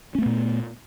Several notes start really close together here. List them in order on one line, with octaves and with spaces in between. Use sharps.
C#4 A3 B3 A#2